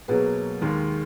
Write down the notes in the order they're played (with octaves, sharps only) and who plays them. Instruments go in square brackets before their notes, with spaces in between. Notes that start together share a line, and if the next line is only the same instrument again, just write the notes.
[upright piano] B2 F#3 A#3 [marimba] G#4 B4
[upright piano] D#2 D#3 G#3